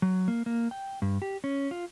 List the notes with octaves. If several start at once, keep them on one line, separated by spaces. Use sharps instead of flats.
F#3
A#3
A#3
G5
G2
G4
C#4
F4